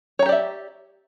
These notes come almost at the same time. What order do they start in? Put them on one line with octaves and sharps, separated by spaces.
C#5 A#5 G4 D5 E5